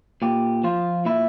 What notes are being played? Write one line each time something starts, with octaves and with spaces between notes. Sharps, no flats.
A#2 G4
F3 F4
A#2 E4